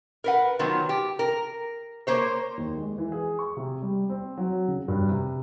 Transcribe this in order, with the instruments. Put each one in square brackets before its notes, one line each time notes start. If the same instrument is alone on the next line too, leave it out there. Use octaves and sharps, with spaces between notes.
[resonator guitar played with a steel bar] A#4 B4 F#5
D#3 F3 F#3 B3
G4
A#4
A#3 C5 C#5
[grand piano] D#2
G#3
E3
G#4
C#6
C3
G3
C4
F#3
C#3
G2
C3